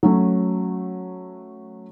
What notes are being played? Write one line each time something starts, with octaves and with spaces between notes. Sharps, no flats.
F#3 A3 C#4